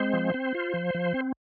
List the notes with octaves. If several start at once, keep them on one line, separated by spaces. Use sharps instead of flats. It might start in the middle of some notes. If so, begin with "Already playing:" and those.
Already playing: G#3 C4 C5
F3
C4
F4
F3
F3
C4